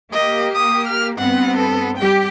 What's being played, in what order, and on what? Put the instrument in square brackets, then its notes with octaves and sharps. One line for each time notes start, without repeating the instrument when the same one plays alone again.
[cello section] A#3 G4 [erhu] D#5
[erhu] D#6
F6
[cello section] G2 B3 C4 [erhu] F#5
[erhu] A4
[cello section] G3 G4 [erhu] G5